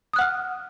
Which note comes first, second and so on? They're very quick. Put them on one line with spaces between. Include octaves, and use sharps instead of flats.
D#6 F#6 F#5 F6